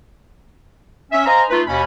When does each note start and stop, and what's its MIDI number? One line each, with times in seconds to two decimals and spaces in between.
1.12 1.24 61
1.12 1.24 76
1.26 1.42 72
1.26 1.42 75
1.26 1.42 77
1.26 1.42 80
1.26 1.42 82
1.50 1.61 57
1.50 1.61 63
1.50 1.61 65
1.50 1.61 71
1.67 1.84 39
1.67 1.84 47
1.67 1.84 61
1.67 1.84 83